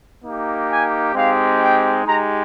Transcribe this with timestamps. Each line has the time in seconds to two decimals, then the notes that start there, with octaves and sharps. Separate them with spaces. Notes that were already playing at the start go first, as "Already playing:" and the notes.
0.24 A#3 D#4 G4
0.69 G#5
1.15 G#3 C4 D#4 G4 F5
1.60 G5
2.06 G#3 D#4 G4 A#5